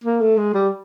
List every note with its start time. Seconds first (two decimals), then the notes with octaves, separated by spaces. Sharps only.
0.04 A#3
0.21 A3
0.37 G#3
0.54 G3